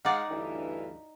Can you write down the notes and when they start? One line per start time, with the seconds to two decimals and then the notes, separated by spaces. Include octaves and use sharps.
0.05 G#3 D#4 D5 F5 F#5
0.30 D2 G2 E3